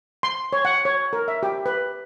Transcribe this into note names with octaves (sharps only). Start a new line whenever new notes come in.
C6
C#5
F#5
C#5
A#4
E5
G4
B4